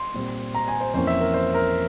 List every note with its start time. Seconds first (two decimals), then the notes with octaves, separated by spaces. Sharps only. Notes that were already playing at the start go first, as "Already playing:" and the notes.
Already playing: C6
0.14 A#2 G3 C4
0.55 A#5
0.68 G#5
0.81 C5
0.94 F2 E3 A#3 C#4 C5
1.07 E5
1.20 A#4
1.34 C5
1.54 A#4